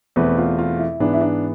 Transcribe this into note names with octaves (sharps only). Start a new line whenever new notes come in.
E2 B2 A3 C4 B4
F4
F4
E4
G#2 E3 B3 D4
E4
D4